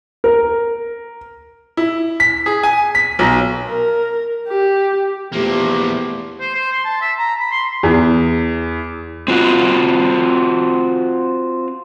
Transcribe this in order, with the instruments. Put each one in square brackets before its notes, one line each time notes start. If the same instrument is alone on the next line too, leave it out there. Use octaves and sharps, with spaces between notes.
[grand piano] A#4
[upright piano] E4
B6
G#4
G#5
B6
B1
[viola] A#4
G4
[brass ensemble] E2 C3 A3 [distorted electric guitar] F3 A#3 [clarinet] G4
[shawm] C5
C5
C6
A5
E5
A#5
B5
C6
[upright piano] E2
[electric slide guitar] C4 F4 F#4